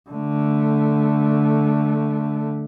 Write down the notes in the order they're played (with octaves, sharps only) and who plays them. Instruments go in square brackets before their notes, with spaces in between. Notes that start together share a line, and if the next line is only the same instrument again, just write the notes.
[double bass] D3 A3